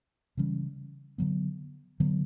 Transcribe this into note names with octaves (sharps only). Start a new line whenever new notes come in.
C#3 E3 G3 C#4
D3 F#3 B3
D3 F#3 B3